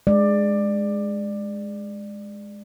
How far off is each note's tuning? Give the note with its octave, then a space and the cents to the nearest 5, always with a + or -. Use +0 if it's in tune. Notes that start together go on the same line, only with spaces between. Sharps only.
G#3 +0 D5 +15